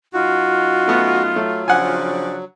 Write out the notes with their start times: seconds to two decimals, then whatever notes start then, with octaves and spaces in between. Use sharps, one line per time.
0.13 F#2 D#4 F4 F#4
0.88 A3 B3
1.36 F#3 A3
1.68 C#3 F3 D4 F#5 G#5